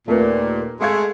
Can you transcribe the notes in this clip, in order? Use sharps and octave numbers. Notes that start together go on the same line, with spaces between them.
D#2 A#2 A3 A#3 B4
G#3 A3 G#4 F5 G#6